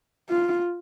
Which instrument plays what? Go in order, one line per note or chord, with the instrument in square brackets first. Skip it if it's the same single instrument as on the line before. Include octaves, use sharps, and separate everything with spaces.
[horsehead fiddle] F4